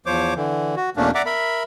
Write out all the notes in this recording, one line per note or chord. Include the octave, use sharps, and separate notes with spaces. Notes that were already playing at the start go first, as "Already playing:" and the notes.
E2 F3 C5 C#5 D6
D3 E3
F#4
E2 B2 A3 A#3 C#4 D4
D5 E5 F#5 A#5 D6
A#4 E5 B5